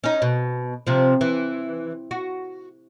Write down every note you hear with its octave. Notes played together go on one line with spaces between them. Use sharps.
C#4 D#4
B2
C3 F3
E3
F#4